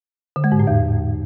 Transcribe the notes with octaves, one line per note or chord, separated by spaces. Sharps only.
D3
G#3
G#2
A2
E2